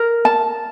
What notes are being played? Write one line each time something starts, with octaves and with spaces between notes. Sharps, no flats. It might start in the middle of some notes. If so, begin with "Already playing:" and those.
Already playing: A#4
A5